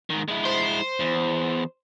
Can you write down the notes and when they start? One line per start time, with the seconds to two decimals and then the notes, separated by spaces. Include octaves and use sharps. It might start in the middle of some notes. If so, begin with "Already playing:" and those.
0.10 G#2 D#3
0.28 G#3 E4
0.45 C5
1.00 E2